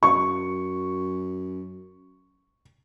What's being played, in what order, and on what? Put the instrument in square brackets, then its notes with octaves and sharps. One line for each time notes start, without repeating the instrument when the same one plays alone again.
[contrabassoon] F#2 [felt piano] C#6